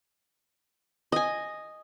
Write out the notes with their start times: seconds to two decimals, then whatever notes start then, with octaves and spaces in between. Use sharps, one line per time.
1.12 D#5 G#5